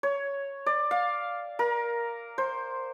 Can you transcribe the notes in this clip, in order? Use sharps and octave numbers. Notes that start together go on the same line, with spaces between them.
C#5
D5
F5
A#4
C5